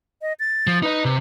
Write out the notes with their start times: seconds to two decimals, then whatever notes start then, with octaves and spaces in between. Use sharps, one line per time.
0.22 D#5
0.40 A6
0.67 F3
0.83 D#4 B4 D#5
1.05 C3